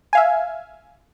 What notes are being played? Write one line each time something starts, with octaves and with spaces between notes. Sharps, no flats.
E5 F5 G#5